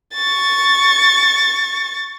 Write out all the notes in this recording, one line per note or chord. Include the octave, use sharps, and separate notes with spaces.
C#6 A6